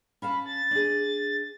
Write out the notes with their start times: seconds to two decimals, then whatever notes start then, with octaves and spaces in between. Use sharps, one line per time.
0.22 C#4 F5 A5 B5
0.46 A6
0.71 D4 G#4